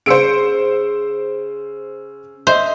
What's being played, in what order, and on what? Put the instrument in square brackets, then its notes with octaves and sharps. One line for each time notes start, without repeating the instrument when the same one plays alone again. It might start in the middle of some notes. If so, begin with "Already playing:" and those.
[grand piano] C#3 E6 [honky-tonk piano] C5 C#7 D7
[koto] C5 [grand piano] D#5 E5